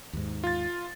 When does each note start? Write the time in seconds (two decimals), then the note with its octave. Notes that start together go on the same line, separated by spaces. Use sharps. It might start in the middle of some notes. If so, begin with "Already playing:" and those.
0.13 D#2 G#2
0.44 F4 A6